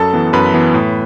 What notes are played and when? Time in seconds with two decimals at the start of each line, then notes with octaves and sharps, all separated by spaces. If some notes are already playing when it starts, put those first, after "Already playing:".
Already playing: F#2 A4 A5
0.13 E3 B3
0.33 F#2 B4 B5
0.54 E3 B3
0.74 A2